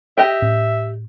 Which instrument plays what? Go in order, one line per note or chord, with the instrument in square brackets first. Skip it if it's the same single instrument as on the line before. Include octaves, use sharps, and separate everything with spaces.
[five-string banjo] G4 D#5 G5 [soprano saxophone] E5
[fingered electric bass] A2 C#4